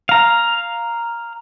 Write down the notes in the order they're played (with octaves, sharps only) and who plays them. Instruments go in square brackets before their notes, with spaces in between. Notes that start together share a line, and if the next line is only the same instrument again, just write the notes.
[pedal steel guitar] F5 A#5